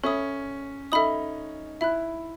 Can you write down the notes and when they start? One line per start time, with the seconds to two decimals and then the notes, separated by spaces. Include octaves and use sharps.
0.03 C#4 A4 E5 B5 D#6
0.92 D#4 A4 E5 B5 D#6
1.81 E4 E5 B5 F#6